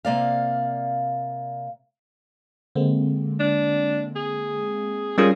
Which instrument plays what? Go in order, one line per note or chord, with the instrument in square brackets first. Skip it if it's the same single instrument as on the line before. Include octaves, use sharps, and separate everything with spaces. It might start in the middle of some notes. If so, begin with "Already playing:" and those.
[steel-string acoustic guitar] C3 A#3 D5 F5
[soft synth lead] D3 [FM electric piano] G#3 A#3 C4
[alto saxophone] D4
G#4
[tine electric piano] G3 C#4 F4 [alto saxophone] G#4 [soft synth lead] A#4